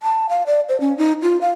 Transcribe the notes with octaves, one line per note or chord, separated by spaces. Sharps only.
A5
F5
D5
C5
C#4
D#4
F4
F5